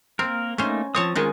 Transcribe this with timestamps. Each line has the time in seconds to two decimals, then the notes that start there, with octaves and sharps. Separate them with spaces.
0.19 A#3 C4 A#4
0.58 A3 A#3 C#4 D#4 C5
0.95 F3 C4 C#5 A5 D#6
1.15 D#3 G#3 C#4 D#4 F4 G#4